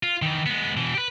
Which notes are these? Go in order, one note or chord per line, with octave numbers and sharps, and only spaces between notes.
F4
D#3 E3
G#3 B3
B2 E3
G4 B4